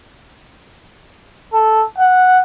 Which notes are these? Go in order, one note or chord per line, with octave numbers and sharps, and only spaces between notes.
A4
F#5